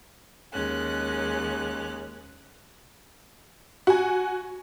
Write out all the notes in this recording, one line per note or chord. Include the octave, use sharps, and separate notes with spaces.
D#2 G#3 C#4 F#6
F#4 G#5